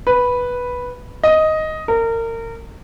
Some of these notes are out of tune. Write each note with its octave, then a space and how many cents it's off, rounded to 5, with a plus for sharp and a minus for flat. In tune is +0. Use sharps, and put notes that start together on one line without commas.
B4 -5
D#5 +5
A#4 -30